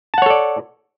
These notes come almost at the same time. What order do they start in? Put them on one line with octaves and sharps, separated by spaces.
A5 F#5 C#5 A4 D5